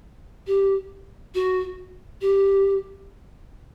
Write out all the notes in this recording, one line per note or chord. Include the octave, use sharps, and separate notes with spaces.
G4
F#4
G4